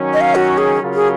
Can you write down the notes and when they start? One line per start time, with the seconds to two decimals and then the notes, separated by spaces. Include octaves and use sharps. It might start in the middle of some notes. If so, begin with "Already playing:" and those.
Already playing: D#3 F#3 C#4
0.13 D#5
0.21 F5
0.35 F#4
0.58 G#4
0.80 C#3 F#3 C#4 F4 A#4
0.94 G#4